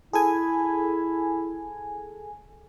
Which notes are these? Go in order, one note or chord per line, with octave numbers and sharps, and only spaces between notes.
E4 G#4 A4 G#5